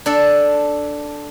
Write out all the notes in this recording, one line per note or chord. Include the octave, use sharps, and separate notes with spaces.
D4 A4